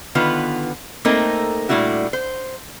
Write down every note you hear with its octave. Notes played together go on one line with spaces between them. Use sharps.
D3 D#3 B3 F4 B4
A3 A#3 C4 D#4 A4 A#4
A#2 G3 A3 D4 E4 F#4
C5